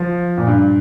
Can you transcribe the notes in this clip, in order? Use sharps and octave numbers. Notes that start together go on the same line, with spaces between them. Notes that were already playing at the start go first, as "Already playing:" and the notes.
Already playing: F3
A#2
G2